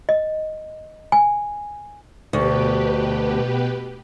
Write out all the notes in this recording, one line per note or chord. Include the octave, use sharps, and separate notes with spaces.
D#5
G#5
D2 B2 G4 B4